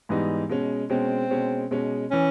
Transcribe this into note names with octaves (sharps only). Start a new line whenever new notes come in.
G#2 E3 G3 B3 D#4
B2 G#3 C#4
B2 G#3 C4 C#4
B2 G#3 C#4
B2 G#3 C#4
E3 C#4